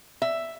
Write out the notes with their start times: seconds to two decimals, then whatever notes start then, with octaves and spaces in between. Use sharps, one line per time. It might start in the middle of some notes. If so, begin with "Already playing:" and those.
0.22 E5